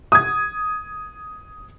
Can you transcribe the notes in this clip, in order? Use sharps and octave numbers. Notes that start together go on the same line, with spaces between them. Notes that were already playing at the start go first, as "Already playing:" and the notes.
D#6 G#6